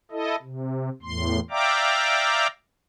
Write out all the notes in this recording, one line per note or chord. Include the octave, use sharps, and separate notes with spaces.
E4 A4 D#5
C3
E2 A2 C6
D5 E5 F5 G5 A#5 D6